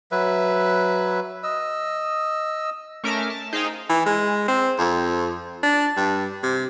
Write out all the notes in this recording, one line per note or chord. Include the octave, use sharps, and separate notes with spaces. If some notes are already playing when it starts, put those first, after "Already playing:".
F#3 B4 E5
D#5 E6
A3 C#4 A#4 E5 D6 F6
A5
D#4 G#4 C5 D#5 F5 G5
E3
G#3
C4
F2
D4
G2
C3